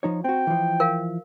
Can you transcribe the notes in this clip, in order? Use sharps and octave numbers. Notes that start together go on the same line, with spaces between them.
F3 D#4 C#5
C4 F#4 G5
E3 F3
A#4 F5